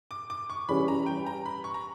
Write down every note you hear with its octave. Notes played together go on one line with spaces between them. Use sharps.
D6
D6
C#6
E3 G3 C#4 B5
A#5
G5
A#5
B5
C#6
A#5